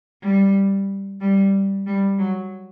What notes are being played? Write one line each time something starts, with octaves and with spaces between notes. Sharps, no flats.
G3
G3
G3
F#3